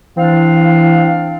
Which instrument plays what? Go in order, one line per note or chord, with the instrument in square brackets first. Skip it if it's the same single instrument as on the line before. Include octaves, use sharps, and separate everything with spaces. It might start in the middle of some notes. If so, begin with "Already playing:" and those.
[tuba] E3 [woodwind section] C4 D4 F5